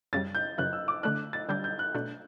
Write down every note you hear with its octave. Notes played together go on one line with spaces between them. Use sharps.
F#2 C#3 G3 A6
G6
F#2 C#3 E3 F#6
E6
D6
D3 A3 D4 F#6
A6
D3 G3 D4 G6
G6
F#6
B2 A3 D4 F#6